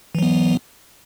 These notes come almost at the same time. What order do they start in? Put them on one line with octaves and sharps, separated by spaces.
E3 F#3 B3